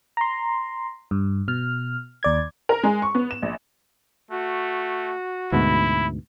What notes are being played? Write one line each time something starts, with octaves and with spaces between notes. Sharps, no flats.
A#5 C6
G2
B2 F6
D#2 D5 G#6
A#4
G#3
C#6
B3
E7
A#1
A3 F#4
D2 G#2 B2 E4 B5